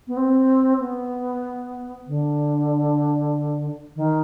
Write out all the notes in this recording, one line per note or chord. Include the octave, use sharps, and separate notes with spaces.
B3
C4
B3
D3
D#3